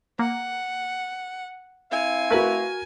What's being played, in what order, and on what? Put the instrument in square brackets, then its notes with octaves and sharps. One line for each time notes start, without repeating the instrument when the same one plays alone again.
[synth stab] A#3 [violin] F#5
[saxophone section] C4 E4 F5 [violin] G#5
[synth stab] A3 B4 [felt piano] F#4 A#4